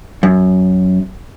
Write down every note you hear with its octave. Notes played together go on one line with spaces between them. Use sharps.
F#2